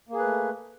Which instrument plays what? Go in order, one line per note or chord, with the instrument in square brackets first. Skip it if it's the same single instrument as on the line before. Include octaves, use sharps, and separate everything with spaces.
[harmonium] A#3
G#4
B4
A3